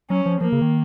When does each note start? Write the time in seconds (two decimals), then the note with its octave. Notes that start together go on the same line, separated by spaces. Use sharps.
0.10 F#3 C#4
0.26 F3
0.41 F3 A#3
0.52 C#3
0.61 D#3